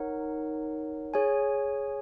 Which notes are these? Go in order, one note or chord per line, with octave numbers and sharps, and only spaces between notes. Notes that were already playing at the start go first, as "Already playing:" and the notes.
Already playing: D#4 A#4 C#5 F#5
G#4 C#5 G#5